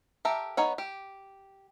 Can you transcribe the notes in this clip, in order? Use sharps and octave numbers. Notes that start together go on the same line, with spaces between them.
G4 A4 A#4 E5
B3 D#4 C#5 F#5
G4